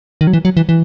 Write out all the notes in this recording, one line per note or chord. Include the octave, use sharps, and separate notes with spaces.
D#3
F#3
E3
F#3
E3
E3